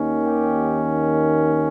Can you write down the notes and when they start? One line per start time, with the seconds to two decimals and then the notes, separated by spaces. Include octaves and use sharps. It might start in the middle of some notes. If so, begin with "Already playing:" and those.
Already playing: D#2 D#3 A#3 C#4
0.23 G4 G5